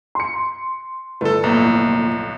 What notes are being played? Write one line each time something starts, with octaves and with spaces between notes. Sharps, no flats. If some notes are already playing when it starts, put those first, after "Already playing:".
C6 C#7
G1 A3 E4 A4 B4
B1 F2 A2 A#3 A#5